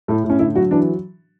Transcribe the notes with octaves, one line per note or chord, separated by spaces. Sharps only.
A2 A3
A2
C#4
D3 E4
F#3 F#4
E3 D4